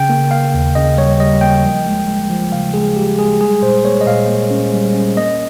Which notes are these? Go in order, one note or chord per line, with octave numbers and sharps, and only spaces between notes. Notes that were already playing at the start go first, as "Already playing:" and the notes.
Already playing: C#3 G5
A#3
A#3 F5
D#2
C#3 D#5
G3 C#5
G3 D#5
A#3 G5
F3
G#3
G#3
F3
C#3 F5
G#3 G#4
G#3 G4
G#3 G#4
G3 G#4
A#2 C5
A#3 C#5
D#5
A#2 F5
A#3
C#4
G3
C#4
A#3 D#5